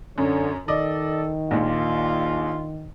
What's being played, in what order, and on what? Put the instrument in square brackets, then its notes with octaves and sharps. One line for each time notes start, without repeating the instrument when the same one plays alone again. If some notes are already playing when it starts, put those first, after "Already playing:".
[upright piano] F#2 [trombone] D3 [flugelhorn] C#5
[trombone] D#3 [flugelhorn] A4 [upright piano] D5 D#5
[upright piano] A#1 D#2 [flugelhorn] F4